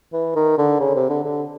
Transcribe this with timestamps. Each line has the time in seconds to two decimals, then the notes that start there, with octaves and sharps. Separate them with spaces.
0.13 E3
0.36 D#3
0.58 D3
0.80 C#3
0.95 C3
1.10 D3
1.24 D3